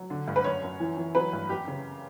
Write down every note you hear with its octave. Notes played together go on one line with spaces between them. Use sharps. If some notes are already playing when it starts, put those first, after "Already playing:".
Already playing: F#3
D3
G2
B4
F#2 C#5
F#2
E3
E3
F#3 B4
G2
F#2 G4
C#3